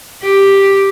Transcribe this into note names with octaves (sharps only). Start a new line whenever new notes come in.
G4